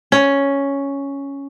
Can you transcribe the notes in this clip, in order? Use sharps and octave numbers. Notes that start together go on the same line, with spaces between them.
C#4